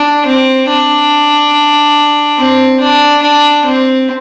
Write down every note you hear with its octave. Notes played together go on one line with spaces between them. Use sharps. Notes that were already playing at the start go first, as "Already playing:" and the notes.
Already playing: D4
C4
D4
C4
D4
D4
C4